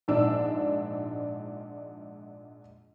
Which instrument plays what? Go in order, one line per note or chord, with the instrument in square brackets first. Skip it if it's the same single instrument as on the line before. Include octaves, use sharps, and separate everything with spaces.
[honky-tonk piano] A#1 G#2 D4 E6